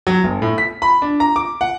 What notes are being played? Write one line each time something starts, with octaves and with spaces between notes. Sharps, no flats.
F#3
G1
A2
B6
B5
D4
A#5
D6
F#5